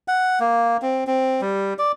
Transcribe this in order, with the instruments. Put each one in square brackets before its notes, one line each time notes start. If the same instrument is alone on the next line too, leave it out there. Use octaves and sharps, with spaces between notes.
[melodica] F#5
A#3
C4
C4
G3
D5